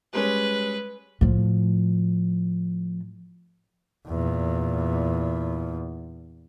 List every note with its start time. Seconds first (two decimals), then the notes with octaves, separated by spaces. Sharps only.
0.13 G3 G#3 C#4 B4
1.21 A2 F3
4.07 E2 A#2